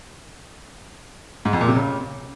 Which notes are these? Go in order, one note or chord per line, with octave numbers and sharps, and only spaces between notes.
G#2
F2
A#2
C3
C#3